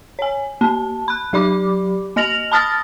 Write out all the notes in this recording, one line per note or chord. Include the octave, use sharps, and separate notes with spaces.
C#5 G#5
A#3 A5
B5 F#6
F#3 G4 D5 B5 D6
A#3 D#5 F6 A#6 F7 F#7
A5 B5 D#6 F6 A6 A#6